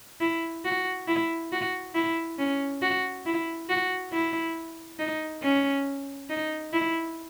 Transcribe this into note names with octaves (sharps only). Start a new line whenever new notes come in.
E4
F#4
E4
F#4
E4
C#4
F#4
E4
F#4
E4
D#4
C#4
D#4
E4